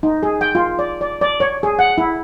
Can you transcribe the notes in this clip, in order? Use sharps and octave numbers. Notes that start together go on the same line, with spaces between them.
D#4
G#4
G5
F4
D5
D5
D5
C#5
G#4
F#5
E4